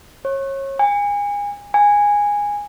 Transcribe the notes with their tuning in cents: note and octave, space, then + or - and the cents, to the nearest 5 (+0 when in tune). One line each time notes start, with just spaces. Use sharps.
C#5 -30
G#5 -30
G#5 -10